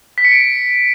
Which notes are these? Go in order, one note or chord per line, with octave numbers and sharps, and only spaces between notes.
B6
C#7
D7